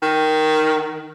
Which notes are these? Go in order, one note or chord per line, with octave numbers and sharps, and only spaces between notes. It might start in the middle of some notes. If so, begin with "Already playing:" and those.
D#3